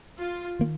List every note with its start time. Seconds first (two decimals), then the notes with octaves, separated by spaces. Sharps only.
0.16 F4
0.59 D#3 A#3